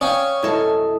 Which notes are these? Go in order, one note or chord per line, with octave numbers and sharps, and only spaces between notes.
C#4 D5 F5 G5 D#6
C2 F#2 E4 A4 D#5